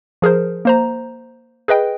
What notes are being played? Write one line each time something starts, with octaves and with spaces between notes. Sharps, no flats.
F3 G#4 A#4 C5
A#3 C5 A#5
G#4 B4 D#5 G5